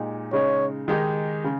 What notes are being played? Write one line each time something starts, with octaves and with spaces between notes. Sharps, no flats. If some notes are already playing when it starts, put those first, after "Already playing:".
Already playing: A#2 G#3 D#4 G4
C#3 G#3 D#4 C#5
D#3 G#3 D#4 G4
C#3